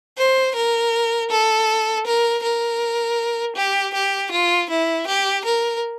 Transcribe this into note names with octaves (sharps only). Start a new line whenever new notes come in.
C5
A#4
A4
A#4
A#4
G4
G4
F4
E4
G4
A#4